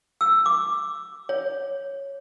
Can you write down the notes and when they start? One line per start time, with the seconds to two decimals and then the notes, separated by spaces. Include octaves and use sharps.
0.21 E6
0.46 D6
1.29 C#5